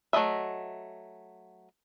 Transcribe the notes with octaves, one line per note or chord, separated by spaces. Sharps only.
F#3 A3 D4 D#5 E5